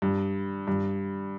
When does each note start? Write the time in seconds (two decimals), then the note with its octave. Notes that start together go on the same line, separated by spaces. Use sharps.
0.02 G2
0.67 G2